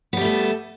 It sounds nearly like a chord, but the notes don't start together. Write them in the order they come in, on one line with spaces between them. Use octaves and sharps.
B3 G3 A3 A4